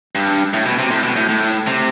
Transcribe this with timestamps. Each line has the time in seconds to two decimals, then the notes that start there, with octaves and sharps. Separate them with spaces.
0.15 G2
0.54 A2
0.66 B2
0.79 C3
0.91 A2
1.03 B2
1.16 A2
1.29 A2
1.67 C3